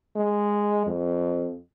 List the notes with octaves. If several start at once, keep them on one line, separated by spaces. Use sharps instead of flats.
G#3
F2